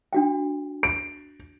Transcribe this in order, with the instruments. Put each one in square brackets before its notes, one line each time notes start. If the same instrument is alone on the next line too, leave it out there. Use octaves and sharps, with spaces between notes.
[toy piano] D4 F#4 G5
[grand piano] D7